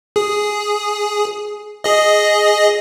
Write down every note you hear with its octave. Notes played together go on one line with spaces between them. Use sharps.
G#4
G#4 D#5